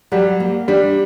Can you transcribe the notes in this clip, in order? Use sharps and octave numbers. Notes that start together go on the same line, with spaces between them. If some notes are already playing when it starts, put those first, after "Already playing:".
F#3 G3
A#3
G3 D4